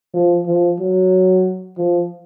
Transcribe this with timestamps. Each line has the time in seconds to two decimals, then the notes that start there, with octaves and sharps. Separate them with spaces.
0.14 F3
0.46 F3
0.80 F#3
1.78 F3